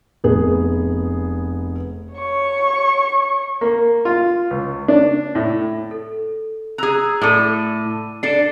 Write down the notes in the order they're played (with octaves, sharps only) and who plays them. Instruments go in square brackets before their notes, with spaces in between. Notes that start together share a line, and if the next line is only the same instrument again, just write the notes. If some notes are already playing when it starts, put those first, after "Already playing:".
[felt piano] F1 B3 G#4
[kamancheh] C#5 C#6
[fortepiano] A#3
F4
C#2
D4
A2
[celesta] A4
[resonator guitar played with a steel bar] G#4 A#5 [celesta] E6 F#6
[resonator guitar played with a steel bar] A2 A4 [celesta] D5 D6 D#7
[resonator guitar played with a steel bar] D4 A4 [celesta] C7 E7